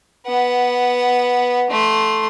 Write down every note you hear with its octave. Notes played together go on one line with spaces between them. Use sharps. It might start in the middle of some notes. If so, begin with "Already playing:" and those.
B3 F#5
A3 C6